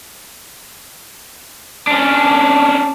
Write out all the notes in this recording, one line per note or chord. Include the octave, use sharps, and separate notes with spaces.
C#4 D4